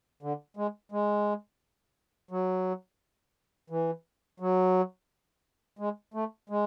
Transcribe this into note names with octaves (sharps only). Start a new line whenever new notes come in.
D3
G#3
G#3
F#3
E3
F#3
G#3
A3
G#3